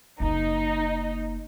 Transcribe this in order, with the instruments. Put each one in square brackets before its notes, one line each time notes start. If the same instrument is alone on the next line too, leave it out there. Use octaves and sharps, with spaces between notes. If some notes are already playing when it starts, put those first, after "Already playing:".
[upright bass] F#1 A#3 [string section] D#4